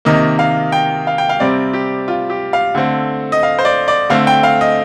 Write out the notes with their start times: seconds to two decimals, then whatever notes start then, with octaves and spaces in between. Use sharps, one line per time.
0.05 C3 D#3 A#3 D#5
0.39 F5
0.72 G5
1.07 F5
1.18 G5
1.29 F5
1.40 C3 G3 C4 D5
1.73 G4
2.08 F4
2.30 G4
2.53 F5
2.75 D3 A3 C4
3.32 D#5
3.43 F5
3.58 C5
3.65 D5
3.88 D5
4.10 D3 A3 C4 F5
4.27 G5
4.43 F5
4.61 D#5